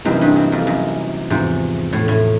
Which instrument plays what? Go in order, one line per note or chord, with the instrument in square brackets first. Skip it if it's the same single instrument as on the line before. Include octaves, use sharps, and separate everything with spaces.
[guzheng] F#2 [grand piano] C3 E3 G3 A#3 D#4
[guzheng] G2
F#2
F2
F#2
[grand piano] E2 C3 F3 [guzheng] G#2
[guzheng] A2
A2